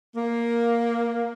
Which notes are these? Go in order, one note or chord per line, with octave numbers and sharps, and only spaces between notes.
A#3